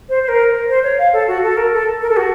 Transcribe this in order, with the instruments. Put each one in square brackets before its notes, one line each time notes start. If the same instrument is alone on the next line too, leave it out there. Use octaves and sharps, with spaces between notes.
[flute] C5
C5
A#4
C5
C#5
F5
A4
F#4
A4
A#4
A4
A#4
A4
F#4